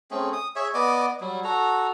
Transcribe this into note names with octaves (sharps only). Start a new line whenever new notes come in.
A3 C4 C#4 G#4
D#6
G#4 C#5 E5
B3 D5 D#5 D6
F#3 G3
F#4 A4 A#5